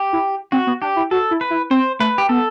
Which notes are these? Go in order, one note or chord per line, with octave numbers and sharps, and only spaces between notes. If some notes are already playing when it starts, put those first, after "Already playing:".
Already playing: G4
E4
C4 F#4
B3
D4 G4
E4
F#4 A4
E4
B4
E4
C4 C5
A3 B4
G4
B3 A4